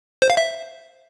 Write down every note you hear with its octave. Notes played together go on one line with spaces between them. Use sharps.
C5
F5
E5